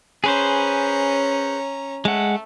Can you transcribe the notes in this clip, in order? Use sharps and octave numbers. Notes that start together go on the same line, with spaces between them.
C#4 G#4 B4 C5 A#5
G#3 A3 F#5